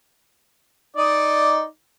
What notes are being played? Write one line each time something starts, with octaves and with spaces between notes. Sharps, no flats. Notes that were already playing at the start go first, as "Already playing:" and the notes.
D#4 D5 D#5